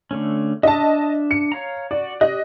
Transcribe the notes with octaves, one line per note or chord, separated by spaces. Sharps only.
D3 A3 C#4
D4 D#5 E5 A5
C#7
C#5 F5 A#5
F#4 D5
G4 D5 D#5 F#6